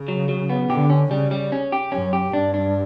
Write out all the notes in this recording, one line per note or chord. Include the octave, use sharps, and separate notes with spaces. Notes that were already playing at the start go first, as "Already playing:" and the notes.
Already playing: C#3
F#3
F#3
B3
D3 G4
C#4
C#3 G3
G3
C#4
G4
F#2 C#4
G4
G2 D4
D4